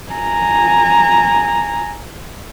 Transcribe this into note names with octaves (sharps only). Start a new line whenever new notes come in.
G#5 A#5